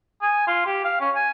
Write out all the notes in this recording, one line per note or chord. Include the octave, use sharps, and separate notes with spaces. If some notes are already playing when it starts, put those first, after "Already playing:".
G#5
F4
G4
F5
C#4
G#5